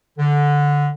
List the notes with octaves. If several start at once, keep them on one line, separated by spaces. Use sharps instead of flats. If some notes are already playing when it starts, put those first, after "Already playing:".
D3